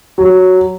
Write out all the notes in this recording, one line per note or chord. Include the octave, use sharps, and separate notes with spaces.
F#3